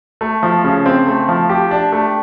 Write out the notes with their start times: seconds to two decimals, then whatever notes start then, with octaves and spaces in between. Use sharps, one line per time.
0.21 A3
0.43 F3
0.64 C#3
0.86 C4
1.07 A3
1.29 F3
1.49 G4
1.71 D4
1.92 A3